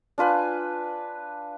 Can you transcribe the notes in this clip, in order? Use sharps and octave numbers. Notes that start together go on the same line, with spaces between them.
D4 F4 B4 G#5